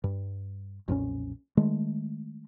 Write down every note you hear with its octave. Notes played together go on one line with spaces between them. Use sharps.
G2
B1 F2 A#2 C#4
D#3 G#3 A3